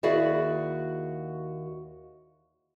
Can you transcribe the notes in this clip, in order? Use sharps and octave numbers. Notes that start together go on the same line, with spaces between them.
D#2 E4 F#4 G#4 D5